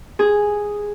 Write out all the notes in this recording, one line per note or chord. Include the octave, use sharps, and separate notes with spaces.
G#4